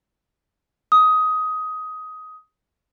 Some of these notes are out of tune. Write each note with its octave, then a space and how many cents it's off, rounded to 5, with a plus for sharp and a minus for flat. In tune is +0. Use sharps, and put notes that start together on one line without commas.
D#6 +15